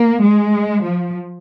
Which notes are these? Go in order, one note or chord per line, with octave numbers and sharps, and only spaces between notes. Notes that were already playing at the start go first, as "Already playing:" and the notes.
Already playing: A#3
G#3
F3